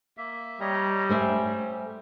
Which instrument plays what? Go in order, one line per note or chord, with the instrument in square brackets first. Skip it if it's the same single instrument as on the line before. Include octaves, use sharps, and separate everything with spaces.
[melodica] A#3 E5
[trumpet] G3 [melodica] C#5 D#5 A#5
[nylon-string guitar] A3 C5 E5 [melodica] C#4